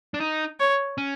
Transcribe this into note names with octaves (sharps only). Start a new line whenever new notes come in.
D4
D#4
C#5
C#4